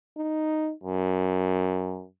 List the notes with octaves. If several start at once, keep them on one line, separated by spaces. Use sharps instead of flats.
D#4
F#2